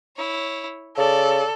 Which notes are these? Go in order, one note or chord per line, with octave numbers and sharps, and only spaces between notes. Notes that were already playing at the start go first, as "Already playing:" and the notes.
E4 C#5
C#3 A4 D5